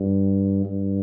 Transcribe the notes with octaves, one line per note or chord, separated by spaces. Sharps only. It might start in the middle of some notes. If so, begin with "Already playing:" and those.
Already playing: G2
G2